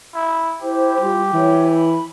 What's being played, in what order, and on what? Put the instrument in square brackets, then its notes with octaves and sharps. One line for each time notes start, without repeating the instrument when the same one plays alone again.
[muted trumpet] E4
[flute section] E4 C5 [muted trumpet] G4
[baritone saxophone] G3 [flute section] F4
[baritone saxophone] E3 [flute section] C#5
[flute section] B5